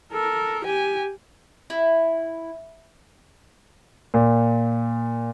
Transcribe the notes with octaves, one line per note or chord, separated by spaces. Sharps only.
A4 A#4
G4 G#5
E4
A#2